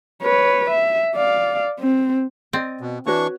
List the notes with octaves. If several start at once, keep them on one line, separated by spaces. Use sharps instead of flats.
B4 C#5
E5
D5 F5
C4
C4 D5 D#5
B2
E3 D4 F#4 B4 C#5 C#6